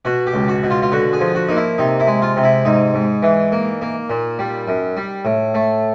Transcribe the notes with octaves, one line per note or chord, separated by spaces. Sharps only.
B2 F#4
G4
C#2
F#4
B2
F4
F4
D3 F#4
G#4
F3
F#4
A#3 D#4
E4
C3 D#4
E4
G#3
F4
C3
E4
G#2 D#4
G#2
E3
A#3
A#3
A#2
G3
F#2
G3
A2
A3